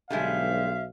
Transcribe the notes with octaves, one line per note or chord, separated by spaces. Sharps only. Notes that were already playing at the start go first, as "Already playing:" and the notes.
B1 D3 G3 G#3 E5 F5